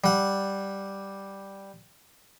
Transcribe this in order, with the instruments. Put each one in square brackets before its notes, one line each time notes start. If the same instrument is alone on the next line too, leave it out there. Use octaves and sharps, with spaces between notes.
[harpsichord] G3 F#5